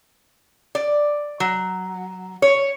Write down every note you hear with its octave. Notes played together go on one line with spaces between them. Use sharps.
D5
F#3
C#5